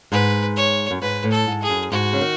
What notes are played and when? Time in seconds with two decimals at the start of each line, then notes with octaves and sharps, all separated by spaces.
0.12 G#2 B4
0.56 C#5
0.91 F#2
1.02 G#2 B4
1.24 A2
1.31 A4
1.46 G#2
1.62 G#4
1.69 F#2
1.92 G#2 F#4
2.13 C#3
2.21 D#3